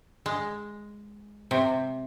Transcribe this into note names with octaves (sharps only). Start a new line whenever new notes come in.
G#3
C3